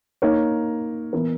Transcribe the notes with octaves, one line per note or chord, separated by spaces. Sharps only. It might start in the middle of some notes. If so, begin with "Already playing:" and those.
A#3 D#4 A#4 C#5
E3 B3 E4 A#4